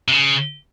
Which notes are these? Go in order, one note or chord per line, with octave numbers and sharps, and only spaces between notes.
C3
C#3